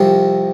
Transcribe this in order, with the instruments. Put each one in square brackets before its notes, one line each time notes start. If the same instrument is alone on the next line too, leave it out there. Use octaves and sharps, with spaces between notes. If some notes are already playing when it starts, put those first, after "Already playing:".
Already playing: [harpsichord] C2 C3 F3